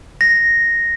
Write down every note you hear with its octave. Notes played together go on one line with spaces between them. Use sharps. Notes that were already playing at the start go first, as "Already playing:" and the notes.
A#6